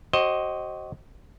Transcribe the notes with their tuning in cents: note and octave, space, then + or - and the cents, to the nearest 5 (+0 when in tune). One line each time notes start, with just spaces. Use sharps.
F#4 +40 C5 +25 D#5 +0